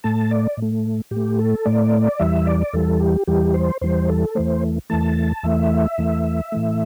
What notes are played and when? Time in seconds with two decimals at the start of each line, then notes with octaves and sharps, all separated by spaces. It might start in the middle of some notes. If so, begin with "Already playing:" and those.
0.04 A2 A3 A5
0.31 D5
0.57 A2 A3
1.11 A2 G4
1.16 A3
1.39 A4
1.65 A2 A3 D5
2.19 E2 E3 G3 E5
2.47 D5
2.73 E2 E3 G3 A4
3.00 G4
3.27 E2 E3 G3 G4
3.54 C5
3.81 E2 E3 G3 C5
4.09 A4
4.35 E2 E3 A3 C5
4.90 E2 E3 A3 A5
5.43 E2 E3 A3 E5
5.98 E2 E3 A3
6.52 A2 E3 A3